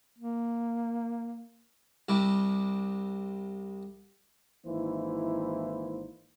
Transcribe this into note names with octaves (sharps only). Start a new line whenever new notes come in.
A#3
C2 C3 G3
G#1 E3 A#3 D#4 E4 C5